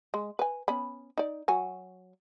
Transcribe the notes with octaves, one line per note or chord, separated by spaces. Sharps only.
G#3
B4 G#5
B3 C#4 B5
D#4 D5
F#3 F#4 G#5